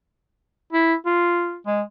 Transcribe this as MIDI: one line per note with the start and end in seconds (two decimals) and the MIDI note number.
0.73 0.94 64
1.06 1.57 65
1.67 1.81 56